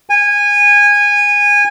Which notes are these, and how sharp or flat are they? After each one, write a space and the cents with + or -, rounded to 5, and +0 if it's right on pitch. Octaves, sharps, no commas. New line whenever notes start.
G#5 -20